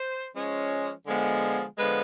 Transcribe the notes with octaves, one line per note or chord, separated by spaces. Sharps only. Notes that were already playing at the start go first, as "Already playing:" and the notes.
Already playing: C5
F3 G#3 C#4
D3 F3 G#3 B3
D3 F3 G#3 B3 B4